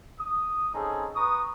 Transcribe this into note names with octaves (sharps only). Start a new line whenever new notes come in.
D#6
C4 C#4 D#4 G#4 A4
B4 A#5 C#6 D#6